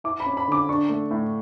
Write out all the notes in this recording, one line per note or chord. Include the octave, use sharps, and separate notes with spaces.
E4 D6
B5
C#4
B5
D3 D6
D4 C#6
A3
A2